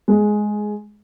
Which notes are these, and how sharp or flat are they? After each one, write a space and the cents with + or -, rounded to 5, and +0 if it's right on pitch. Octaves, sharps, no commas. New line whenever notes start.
G#3 +10 G#4 +15